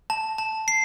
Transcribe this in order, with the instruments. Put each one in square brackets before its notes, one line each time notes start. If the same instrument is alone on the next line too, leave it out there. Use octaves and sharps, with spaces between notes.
[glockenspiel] A5
A5
C7